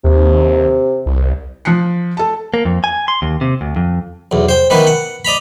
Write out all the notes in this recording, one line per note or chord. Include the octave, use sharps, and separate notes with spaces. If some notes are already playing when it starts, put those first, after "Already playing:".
D#2 C3
C2
F3 F#6 C7 C#7
A4 A5
A#3
F2
G#5
C6
D#2
C3
D2
F2
B1 E2
C5 G5
D#3 E3 B3 B4
F#5
D5 D#5 A#5 B5